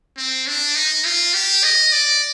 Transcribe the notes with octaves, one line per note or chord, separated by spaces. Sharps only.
C4
D4
D#4
F4
G4
D#5
D5